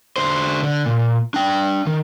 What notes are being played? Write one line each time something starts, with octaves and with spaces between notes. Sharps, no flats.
D3 C5
D3
A#2
D4 G5
D#3